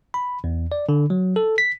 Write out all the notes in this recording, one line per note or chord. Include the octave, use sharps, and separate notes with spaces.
B5
E2
D5
D3
F#3
A4
B6